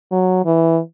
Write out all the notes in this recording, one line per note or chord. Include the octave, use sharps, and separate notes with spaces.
F#3
E3